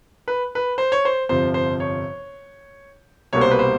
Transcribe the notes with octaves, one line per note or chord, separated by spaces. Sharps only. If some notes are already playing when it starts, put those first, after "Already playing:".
B4
B4
C5
C#5
C5
G1 F2 C3 F3 C5
C5
C#5
C2 B2 G3 A#3 C#5
C5
B4
C5